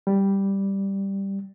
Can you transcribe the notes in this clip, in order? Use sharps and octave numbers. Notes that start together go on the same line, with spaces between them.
G3